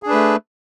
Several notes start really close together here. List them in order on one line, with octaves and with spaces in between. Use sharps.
G#4 D4 B4 A3